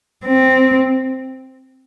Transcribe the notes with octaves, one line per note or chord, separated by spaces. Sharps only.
C4